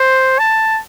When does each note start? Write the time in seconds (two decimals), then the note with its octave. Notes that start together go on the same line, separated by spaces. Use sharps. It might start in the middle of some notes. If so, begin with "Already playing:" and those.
Already playing: C5
0.39 A5